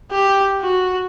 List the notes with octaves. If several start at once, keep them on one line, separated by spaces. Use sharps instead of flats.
G4
F#4